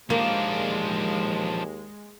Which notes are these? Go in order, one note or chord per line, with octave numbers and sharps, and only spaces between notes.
D#2 F3 G#3 A#3 D4